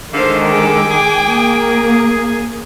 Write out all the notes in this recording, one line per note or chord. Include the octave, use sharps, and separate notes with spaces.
D3 D#3 G#3 C5 F5
G5 G#5 D6
G#4
A#3